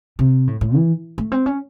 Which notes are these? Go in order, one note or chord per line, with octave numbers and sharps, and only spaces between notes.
C3
A2
A2
E3
A3
C4
C#4